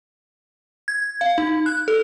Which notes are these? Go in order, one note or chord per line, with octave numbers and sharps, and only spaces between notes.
G#6
F5
D#4
F#6
A4